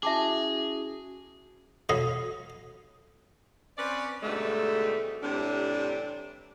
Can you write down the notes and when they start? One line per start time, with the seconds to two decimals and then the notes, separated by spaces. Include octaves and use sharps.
0.03 C#4 E4 F#4 G#4 E5 A5 D6
1.89 F#4 A4 C#5 D#5 F5 B5
3.78 C4 C#4 B4 D5
4.23 G#2 B2 D3 G3 A3 D#4
5.23 A2 C3 E3 G3 D4